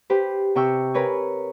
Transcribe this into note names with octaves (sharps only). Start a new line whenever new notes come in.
G4 B4 C5
C3 G5 C#6 E6
A#4 B4 C#5 G#5